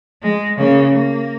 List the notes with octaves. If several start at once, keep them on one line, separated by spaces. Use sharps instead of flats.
G#3
C#3 A#3
A#3